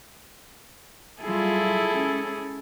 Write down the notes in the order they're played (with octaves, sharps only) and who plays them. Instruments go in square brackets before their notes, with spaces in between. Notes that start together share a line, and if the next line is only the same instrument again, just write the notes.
[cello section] F#3 G3 F4 [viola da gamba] E4 G#4 A4
[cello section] G#3 C#4